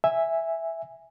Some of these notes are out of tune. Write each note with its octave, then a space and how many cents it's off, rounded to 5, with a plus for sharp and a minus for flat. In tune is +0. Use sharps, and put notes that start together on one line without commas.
E5 +0 G#5 -10